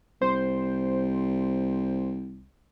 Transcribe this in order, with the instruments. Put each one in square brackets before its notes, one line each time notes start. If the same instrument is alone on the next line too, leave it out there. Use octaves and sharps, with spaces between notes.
[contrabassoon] C2 [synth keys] C5